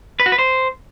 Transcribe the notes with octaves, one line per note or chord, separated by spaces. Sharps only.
B4
F#4
B4
C5